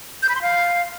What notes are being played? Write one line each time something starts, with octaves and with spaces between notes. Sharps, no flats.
G6
B5
C6
F5